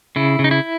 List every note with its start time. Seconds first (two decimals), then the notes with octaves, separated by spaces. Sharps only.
0.16 C#3 E4
0.39 C#3
0.44 D#4
0.51 E4